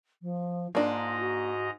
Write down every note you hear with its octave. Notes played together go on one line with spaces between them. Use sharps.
F3
G#2 A#3 D4 F4 D#5 A#5
F#4